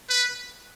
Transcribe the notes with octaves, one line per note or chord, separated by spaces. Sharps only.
B4